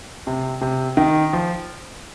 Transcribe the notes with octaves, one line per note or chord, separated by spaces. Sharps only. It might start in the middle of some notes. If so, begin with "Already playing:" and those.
C3
C3
D#3
F3